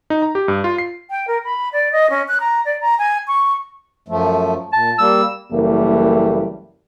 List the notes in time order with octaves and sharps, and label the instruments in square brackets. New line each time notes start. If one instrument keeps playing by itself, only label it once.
[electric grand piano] D#4
A#5
G4
G2
F4
C7
[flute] G5
A#4
B5
D5
D#5
C#4
F#6
A#5
D5
A#5
G#5
C#6
[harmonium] F#2 F3 A3
[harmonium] A#2 [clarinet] A5
[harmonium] G3 A#3 [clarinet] E6
[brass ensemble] F#1 E3 G3 A3 A#3